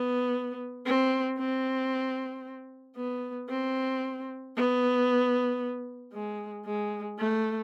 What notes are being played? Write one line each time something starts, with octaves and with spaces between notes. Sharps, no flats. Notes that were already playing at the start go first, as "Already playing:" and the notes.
Already playing: B3
C4
C4
B3
C4
B3
G#3
G#3
A3